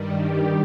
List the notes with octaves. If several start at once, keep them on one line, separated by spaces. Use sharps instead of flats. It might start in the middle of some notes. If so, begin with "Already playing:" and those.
Already playing: G2 D#3 G3
G4